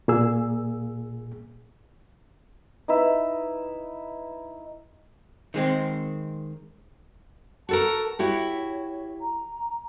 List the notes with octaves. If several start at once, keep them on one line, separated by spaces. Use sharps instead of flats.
A#2 A#3 G#4 E6
D#4 E4 B4 E5
D#3 G#3 C4
F#4 A4 A#4 A5
E4 F#4 G4 C#5
A#5